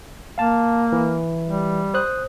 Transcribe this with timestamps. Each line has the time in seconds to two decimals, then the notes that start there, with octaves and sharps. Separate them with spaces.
0.38 A#3 F5 A5
0.92 E3
1.47 G3
1.94 C5 D#6 F#6